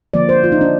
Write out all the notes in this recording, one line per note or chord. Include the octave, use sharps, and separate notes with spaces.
D3 F3 A#3 D5
C5
F4
D#4
D4